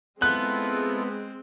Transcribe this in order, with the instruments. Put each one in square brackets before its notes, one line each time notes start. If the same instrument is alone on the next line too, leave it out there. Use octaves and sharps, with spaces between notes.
[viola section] G#3 C4 [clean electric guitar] B3 [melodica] E4 F4 A4 [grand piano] F#6